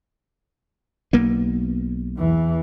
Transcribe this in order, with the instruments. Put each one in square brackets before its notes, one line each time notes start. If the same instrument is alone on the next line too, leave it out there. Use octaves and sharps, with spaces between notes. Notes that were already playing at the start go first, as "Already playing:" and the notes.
[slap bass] B1 A#3 B3
[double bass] E2 E3